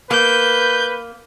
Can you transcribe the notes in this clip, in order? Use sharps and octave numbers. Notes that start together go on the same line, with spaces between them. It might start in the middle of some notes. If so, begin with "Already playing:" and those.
A#3 B4 G6